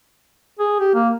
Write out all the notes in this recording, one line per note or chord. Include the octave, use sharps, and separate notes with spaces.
G#4
G4
A#3